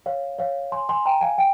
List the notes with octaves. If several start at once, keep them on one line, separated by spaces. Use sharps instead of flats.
C#5 F5
C#5 F5
G#5 C6
G#5 C6
G5 A#5
F5 G#5
G5